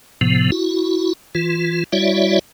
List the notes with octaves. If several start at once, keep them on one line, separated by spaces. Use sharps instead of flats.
A2 C3 F3 B3
E4 F#4
E3 F4
G3 E4 F#4 C#5 D5 E5